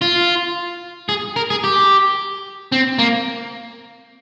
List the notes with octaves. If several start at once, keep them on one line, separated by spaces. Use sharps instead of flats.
F4
G#4
A#4
G#4
G4
C4
A#3